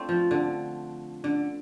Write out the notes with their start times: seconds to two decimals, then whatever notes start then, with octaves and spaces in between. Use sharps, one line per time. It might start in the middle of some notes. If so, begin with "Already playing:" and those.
Already playing: A3 C4 D4 F4
0.09 F3
0.31 D3
1.24 D3